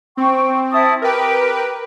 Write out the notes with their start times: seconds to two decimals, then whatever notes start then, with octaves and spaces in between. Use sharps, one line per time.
0.17 C4 G5 C#6
0.71 E4 A5 D#6
1.02 G4 A#4 B4